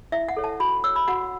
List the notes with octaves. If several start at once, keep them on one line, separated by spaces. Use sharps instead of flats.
E4 E5
F#5
A4 C#5
A5
F#4 B5
C#5 E6
B5
F#4 F#5